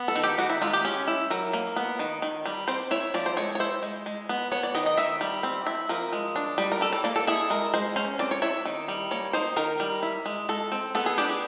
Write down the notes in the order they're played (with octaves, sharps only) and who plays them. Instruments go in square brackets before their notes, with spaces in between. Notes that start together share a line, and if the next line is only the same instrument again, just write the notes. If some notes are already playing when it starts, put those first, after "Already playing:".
Already playing: [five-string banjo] B3
A4
D#3
G4
D#3 F#4
E4
G#3 F4
G4
C#4
E4
F#3 A#4
A#3
B3
D#3
D#3
G3
C4 C5
E4 C#5
F3 D5
C5
G#3 C#5
C#5
E4 C5
G#3
G#3
B3
B3 C#5
D5
D#3 D#5
D#5
D#3 E5
G3
C4
E4
F3 A#4
G#3
D4
G3
A#4
G3 A4
D5
A#3 D5
A4
E4 G#4
G#3 A#4
G#3 C5
C#4 C5
C4 D5
C#5
E4 C#5
D#3
G3
A#3 C#5
D#4 C5
D#3 A#4
G3
E4
G#3
G#3 A4
C4
B3 A4
G#4
D4 G4
G#4